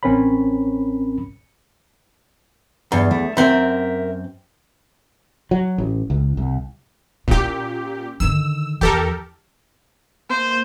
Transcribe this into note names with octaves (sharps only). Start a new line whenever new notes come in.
A1 C4 C#4 A#4 C#5 B5
E2 G2
A3
F#2 C4 A#4 E5
F#3
A1
C#2
C2
A#2 C#4 E4 G4
D3 D#3 E6
E2 E3 G4 A4 A#4
A#3 C5